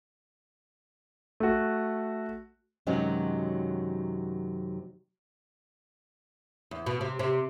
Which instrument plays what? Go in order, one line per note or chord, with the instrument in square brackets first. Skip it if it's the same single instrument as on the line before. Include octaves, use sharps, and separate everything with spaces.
[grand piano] A3 F#4
[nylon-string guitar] F#2 C3 D#3 F#3 G#3
[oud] E2
B2
C3
C3